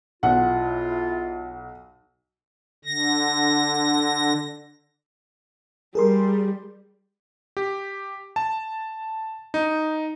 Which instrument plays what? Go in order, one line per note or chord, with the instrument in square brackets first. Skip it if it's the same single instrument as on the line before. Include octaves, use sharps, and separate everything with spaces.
[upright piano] B1 [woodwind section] E4 F4 [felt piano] F#5
[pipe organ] D3 A#6
[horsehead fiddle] G3 [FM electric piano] G#4 A#4 C6
[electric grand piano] G4
A5
D#4